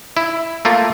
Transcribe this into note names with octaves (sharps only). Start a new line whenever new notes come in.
E4
A3 A#3 F4